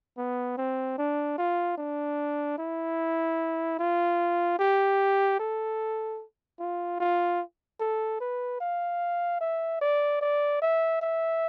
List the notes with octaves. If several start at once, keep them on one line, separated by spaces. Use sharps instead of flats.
B3
C4
D4
F4
D4
E4
F4
G4
A4
F4
F4
A4
B4
F5
E5
D5
D5
E5
E5